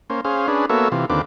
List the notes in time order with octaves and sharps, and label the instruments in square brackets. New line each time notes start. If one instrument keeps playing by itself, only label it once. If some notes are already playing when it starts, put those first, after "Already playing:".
[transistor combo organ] A#3 C#4 C5
C#4 G#4 C5 F5
C#4 D4 G#4 B4
A#3 B3 F#4 A4 C#5 E5
C3 E3 F4
D#2 D3 C4 F4 B4 D6